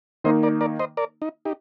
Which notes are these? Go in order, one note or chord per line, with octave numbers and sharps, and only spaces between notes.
D#3 A#3 D#4 C5 D#5
A#4 D5
A#4 D5
C5 D#5
A#4 D5
D#4
D#4 G4